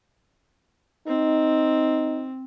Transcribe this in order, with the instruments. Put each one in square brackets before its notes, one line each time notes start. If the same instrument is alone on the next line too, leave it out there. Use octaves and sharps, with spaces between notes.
[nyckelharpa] C4 [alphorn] D#4